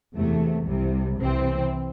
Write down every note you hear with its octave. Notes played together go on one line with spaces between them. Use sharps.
E2 C3 A3
C2 C3 G3
C2 C3 E3 C4